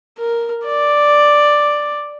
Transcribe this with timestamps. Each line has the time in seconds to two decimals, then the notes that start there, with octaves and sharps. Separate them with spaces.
0.18 A#4
0.65 D5